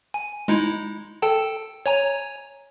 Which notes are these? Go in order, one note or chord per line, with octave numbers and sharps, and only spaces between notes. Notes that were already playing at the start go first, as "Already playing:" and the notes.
G#5
G#3 D#4 E4
A4 G5 A5
C#5 G#5 A#5